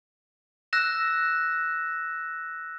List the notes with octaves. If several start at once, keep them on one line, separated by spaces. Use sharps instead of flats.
E6 F#6 A#6 E7